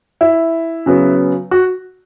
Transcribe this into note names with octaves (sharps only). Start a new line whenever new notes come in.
E4
C#3 F#3 B3
F#4